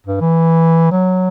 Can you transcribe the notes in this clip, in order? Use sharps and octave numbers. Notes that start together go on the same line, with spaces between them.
G2
E3
F#3